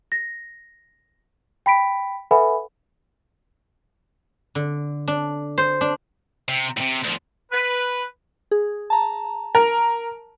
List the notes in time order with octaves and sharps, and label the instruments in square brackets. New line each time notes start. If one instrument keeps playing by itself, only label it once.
[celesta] A#6
G5 B5 B6 D7
A4 B4 E5 F#5 G#5 B5
[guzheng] D3
D4
C5
D4
[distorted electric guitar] C3
A2 C3
D2 F3
[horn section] B4
[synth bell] G#4
A5 A#5
[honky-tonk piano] A#4